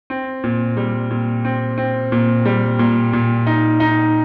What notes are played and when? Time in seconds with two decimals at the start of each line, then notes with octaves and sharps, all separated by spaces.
0.10 C4
0.44 A#2
0.77 G3
1.11 A#2
1.45 C4
1.78 C4
2.12 A#2
2.45 G3
2.79 A#2
3.13 A#2
3.47 D#4
3.80 D#4